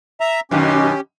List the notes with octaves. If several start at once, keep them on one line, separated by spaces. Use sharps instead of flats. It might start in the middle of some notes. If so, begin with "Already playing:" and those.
E5 A#5
F#2 B2 D#3 C#4 G4